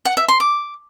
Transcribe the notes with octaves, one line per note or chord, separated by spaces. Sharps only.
F#5
E5
C6
D6